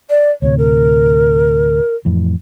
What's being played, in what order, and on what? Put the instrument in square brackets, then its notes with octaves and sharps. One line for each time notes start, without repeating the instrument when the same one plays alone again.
[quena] D5
[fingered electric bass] D2 A2 C3 [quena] C#5
[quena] A#4
[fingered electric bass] F2 A2 E3